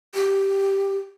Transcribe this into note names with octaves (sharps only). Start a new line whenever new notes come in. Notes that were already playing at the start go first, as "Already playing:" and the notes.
G4